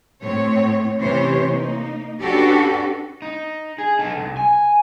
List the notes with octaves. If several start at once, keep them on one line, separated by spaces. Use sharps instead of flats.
A2 C4 C#5
C3 E3 C#4 G4 C5 C#5
A#3 D#4
C#4 D4 F#4 G4 A4 B4
D#4
G#4
D#4 A4
C2
G#5